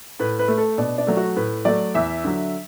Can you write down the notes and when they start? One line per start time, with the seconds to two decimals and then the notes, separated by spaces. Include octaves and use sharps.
0.20 A2 B4
0.39 B4
0.48 A3
0.58 A4
0.78 B2 D4
0.98 D4
1.07 F#3 A3
1.17 F#4
1.36 A2 B4
1.65 F#3 A3 D5
1.95 E2 E5
2.24 D3 F#3